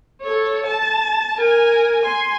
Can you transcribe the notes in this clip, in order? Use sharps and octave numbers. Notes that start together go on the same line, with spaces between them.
A4 C#5
A5
A#4 G#5
G#5 C6